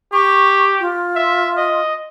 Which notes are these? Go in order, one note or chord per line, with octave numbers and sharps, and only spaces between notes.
G4 C#6
F4
E5
D#5